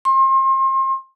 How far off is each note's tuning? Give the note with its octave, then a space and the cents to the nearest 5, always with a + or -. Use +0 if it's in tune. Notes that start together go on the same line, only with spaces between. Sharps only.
C6 +35